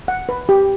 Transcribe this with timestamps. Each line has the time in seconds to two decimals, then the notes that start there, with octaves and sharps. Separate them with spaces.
0.08 F#5
0.29 B4
0.49 G4